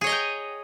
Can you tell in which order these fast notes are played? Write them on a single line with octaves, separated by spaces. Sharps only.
G#4 C#5 D#5 A#5 G5